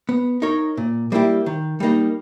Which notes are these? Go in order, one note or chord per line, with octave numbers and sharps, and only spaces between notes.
B3
D#4 A#4 C#5
A#2
G3 A#3 E4 G4
D#3
G3 A#3 D#4